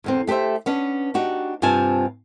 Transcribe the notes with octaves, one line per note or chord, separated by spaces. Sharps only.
E2 D3 C4
A3 G4 G#4 C5 E5
B3 C#4 D4
D4 D#4 F#4 G4
G2 C3 C4 F4 G#5 A5